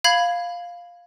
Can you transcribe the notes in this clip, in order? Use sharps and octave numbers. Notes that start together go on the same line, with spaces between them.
F5 B5 G#6 F#7